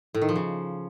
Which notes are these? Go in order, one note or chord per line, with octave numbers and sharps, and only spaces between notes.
A2
D#3
F3
C#3